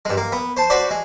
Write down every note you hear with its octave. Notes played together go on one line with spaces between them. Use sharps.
G2 G#3
A#3
B3
C5 A5
F#4 B4 C5 D5
G#3